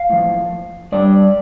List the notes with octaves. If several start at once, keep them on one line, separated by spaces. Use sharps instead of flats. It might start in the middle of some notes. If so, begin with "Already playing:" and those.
Already playing: F5
A2 F3
G2 G3 D5